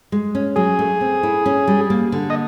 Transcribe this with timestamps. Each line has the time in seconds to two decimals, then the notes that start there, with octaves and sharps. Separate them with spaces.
0.12 G#3
0.35 C#4
0.56 F#3 G#4
0.79 A3
1.01 C4
1.23 E4
1.46 C#4
1.67 G3
1.90 A#3
2.12 D3
2.30 D#5